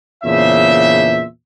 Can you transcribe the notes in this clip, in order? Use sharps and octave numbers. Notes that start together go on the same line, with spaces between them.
E2 A#2 C#3 D4 C5 E5